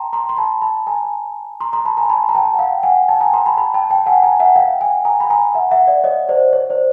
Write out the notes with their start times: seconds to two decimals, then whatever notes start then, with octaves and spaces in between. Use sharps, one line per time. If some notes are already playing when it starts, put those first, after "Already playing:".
Already playing: G5 A5 A#5 C6
0.13 A#5 C6
0.29 C6
0.37 A5 B5
0.62 A5 B5
0.87 G#5 A#5
1.60 A#5 C6
1.73 A#5 C6
1.85 A5 B5
1.97 G#5 A#5
2.05 C6
2.10 A5 B5
2.29 A#5
2.35 G5 A5
2.54 F#5
2.59 F5 G5
2.83 F#5 G#5
3.08 G5 A5
3.21 G#5 A#5
3.33 A#5 C6
3.46 A5 B5
3.58 A5 B5
3.74 G5 A5
3.90 G5 A5
4.06 F#5 G#5
4.23 G#5 A#5
4.40 E5 F#5
4.56 F5 G5
4.81 F#5 G#5
5.05 G#5 A#5
5.20 B5
5.30 G#5 A#5
5.54 E5 F#5
5.71 E5 F#5
5.87 D5 E5
6.04 C#5 D#5
6.29 C5 D5
6.53 C#5
6.70 C5 D5